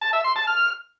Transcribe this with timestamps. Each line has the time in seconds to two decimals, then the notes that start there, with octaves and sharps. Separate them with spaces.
0.01 A5
0.13 E5
0.24 C6
0.36 A5
0.47 F6